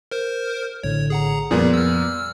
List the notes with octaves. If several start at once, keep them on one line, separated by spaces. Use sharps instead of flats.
A#4 C5
A#1 A2 D3 C#5
G#4 F#5 A#5
F2 A#2 F3 G3 B3 G#4
E6 F6